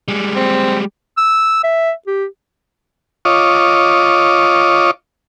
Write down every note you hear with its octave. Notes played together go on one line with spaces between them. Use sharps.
G3 G#3
C4
E6
E5
G4
F4 C#5 D#5 D6